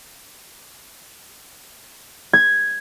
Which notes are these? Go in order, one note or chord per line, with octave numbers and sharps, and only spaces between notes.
G#6